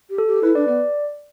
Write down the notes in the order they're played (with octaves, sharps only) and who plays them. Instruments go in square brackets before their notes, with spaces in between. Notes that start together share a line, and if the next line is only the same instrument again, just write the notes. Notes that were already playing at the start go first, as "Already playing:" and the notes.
[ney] G4
[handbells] A4
[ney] G4
[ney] E4 [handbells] B4
[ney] D4 [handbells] D5
[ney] B3 [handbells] D5